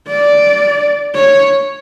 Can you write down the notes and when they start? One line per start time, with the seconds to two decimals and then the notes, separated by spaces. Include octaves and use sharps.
0.08 D5
1.15 C#5